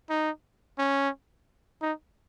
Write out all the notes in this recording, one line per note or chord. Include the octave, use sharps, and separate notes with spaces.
D#4
C#4
D#4